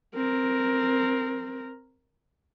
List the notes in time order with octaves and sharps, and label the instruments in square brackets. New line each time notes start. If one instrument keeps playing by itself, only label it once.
[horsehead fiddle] C4 A#4